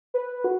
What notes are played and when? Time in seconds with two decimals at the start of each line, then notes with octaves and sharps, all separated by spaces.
0.14 B4
0.44 F#4